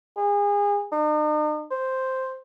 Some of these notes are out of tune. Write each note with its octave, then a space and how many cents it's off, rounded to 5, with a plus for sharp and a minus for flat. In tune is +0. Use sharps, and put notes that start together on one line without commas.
G#4 -30
D#4 -45
C5 +0